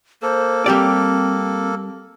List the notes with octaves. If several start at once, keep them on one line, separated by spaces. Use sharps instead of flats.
A#3 A4 C5
G3 C4 G4 D5